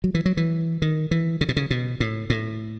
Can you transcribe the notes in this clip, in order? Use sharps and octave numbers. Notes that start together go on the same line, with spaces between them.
F#3
E3
F#3
E3
D#3
E3
C#3
B2
C#3
B2
A2
A2